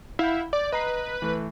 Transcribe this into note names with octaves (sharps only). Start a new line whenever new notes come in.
E4 F5 F#5 G6
D5 D6
B4 D#5 A#5 C7
E3 A3